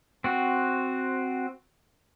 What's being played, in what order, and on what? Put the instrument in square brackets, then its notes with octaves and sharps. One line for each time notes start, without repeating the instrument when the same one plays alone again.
[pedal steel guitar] C4 F#4